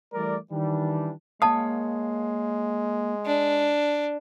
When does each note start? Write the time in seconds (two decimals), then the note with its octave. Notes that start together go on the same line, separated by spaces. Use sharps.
0.14 E3 G3 A3 A#4 D5
0.52 D#3 E3 G3 D4
1.42 G#3 A#3 C#5 F5 A5 D#6
3.26 D4